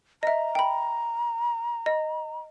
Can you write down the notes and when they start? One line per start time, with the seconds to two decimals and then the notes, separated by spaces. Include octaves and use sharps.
0.23 D#5 E5 A#5
0.55 G5 B5
1.86 D#5